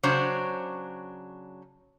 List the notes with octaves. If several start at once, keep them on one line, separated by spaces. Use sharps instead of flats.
C#3 F#3 D4 C5 C#5